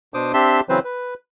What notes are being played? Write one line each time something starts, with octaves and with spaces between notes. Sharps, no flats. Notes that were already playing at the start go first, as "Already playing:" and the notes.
B2 D4 C5 D6 D#6
C4 D4 G4 E5 A5 C6
C#3 E3 F#3 C4 B4 C5
B4